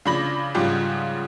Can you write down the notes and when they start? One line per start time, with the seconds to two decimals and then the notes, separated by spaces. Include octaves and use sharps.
0.05 C#3 F3 D4 B5 A#6 F#7
0.54 G#2 C#3 F3 G3 G4